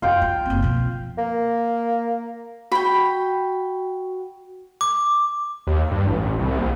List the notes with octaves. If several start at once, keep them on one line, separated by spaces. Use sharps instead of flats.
F#2 F4 G5
D#4
F#1 C4
B2 F3
A#3
F#4 G5 B5
D6
D#2
G2
A1
C2
A#1